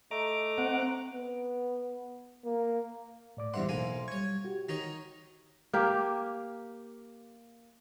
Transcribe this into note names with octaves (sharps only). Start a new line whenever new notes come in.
A3 D#5 A#5 D6 D7
C4 F#5
B3
A#3
A2 D5 D6
E2 G2 C5 E5 F#5 C6
B1 A#3 G#5
G3 C#5 C#6 G#6
F#4 G4
D#3 D#4 C#5
A#3 G4